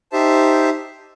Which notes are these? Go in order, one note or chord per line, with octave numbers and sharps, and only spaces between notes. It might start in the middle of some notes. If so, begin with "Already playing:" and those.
D#4 G4 C5 E5 A5